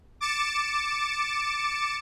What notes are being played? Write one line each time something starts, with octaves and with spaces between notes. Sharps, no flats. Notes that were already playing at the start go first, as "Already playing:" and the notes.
D6 A6 C#7 E7